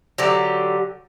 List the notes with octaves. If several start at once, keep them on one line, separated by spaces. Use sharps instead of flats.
D3 F#3 G4